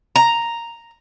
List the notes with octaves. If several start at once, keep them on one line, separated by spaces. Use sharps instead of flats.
A#5